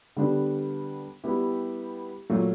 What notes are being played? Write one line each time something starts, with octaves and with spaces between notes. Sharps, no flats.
D3 G3 B3 D4
G3 B3 E4 G4
A#2 F#3 A3